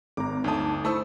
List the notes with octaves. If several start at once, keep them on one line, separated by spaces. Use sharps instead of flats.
G#1 A#5 D6
G1 D2 D#4 A5 D#6
A3 E4 C5 A5 C#6 E6